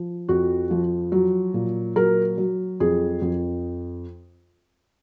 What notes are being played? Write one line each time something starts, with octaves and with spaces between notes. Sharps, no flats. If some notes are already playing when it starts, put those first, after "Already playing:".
Already playing: F3
F2 F#4
F3
F#3
A#2
F#3 A#4
F#3
F2 G#4
F2